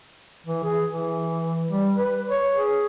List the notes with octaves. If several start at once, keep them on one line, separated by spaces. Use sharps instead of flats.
E3
G#4
E3
G3
B4
C#5
G#4